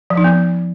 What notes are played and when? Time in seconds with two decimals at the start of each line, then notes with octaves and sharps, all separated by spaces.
0.10 F3
0.17 D#4
0.24 B3